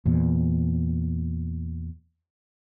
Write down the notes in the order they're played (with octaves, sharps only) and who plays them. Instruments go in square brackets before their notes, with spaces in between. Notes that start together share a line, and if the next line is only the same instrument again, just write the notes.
[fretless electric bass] E2 A#2